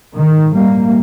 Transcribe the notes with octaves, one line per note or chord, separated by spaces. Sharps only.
A#1 G#2 D#3
G3 A#3